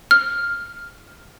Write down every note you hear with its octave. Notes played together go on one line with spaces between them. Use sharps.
F6